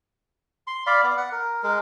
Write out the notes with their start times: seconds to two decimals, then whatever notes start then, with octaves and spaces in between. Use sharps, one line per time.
0.67 C6
0.87 D5 F5 B5
1.03 B3 D5
1.17 F#5
1.32 A#4
1.63 G#3 A#4